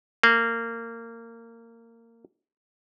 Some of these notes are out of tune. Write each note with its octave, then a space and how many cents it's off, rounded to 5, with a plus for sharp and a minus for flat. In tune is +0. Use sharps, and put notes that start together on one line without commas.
A#3 -20